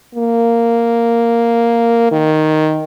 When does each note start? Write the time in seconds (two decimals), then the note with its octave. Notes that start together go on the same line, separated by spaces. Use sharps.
0.15 A#3
2.11 D#3